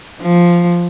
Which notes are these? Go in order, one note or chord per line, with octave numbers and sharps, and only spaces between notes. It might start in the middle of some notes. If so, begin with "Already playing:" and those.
F3